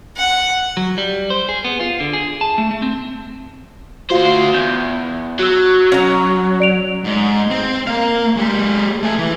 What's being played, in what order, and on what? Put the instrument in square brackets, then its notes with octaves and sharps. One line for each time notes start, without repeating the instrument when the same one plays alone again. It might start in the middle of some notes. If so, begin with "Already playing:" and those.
[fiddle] F#5
[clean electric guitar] F#3
G3
C5
G#4
B3
F4
D3
G#4
A5
A3
A3
C4
[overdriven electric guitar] D2 C5 [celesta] F4 F#4 F5
[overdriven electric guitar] E2 [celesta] G6
[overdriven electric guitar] F#3 [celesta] F#4 E6
[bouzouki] C#4 A#5
[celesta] D5 D7 F7
[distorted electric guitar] G#2
C4
A#3 F5
G#3 G4
A3 G#5
E3